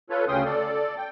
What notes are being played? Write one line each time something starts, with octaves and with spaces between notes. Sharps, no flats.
F4 A4 B4 C#5
D2 C#3 C#4 G5 C6 D#6
A4 D5
G5